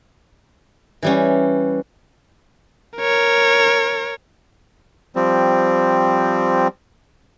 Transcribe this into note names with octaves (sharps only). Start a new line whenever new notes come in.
E3 G3 C#4
A#4 C#5
F3 G3 C4